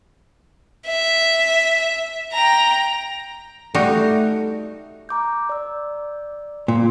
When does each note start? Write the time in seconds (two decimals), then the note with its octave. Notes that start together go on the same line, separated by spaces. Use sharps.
0.87 E5
2.33 G5 A#5
3.74 G3 A3 D#4 F#4
5.09 A#5 D6 G6
5.49 D5 E6
6.68 A#2